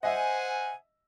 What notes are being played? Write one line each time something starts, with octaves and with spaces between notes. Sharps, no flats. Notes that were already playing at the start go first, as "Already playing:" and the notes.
C5 D#5 E5 F#5 G#5